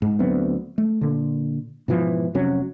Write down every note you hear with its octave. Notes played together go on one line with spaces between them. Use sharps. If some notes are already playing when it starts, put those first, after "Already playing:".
G#2
D2 F#3 B3 C4
A3
A#2 D3
G#2 B2 E3 F3
F1 C3 F#3 C#4